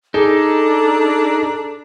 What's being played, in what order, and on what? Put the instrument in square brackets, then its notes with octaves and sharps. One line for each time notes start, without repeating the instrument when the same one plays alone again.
[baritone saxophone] D4 [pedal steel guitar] D#4 [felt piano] G#4 [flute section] A4 A#5 D6